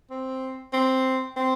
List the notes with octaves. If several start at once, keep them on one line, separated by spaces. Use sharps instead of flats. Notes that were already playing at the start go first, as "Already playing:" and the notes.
C4
C4
C4